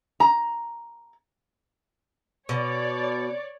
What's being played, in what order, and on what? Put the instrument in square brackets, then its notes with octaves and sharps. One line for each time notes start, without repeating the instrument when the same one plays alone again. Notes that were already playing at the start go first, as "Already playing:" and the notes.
[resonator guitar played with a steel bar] A#5
[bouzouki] B2 [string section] C#5 D5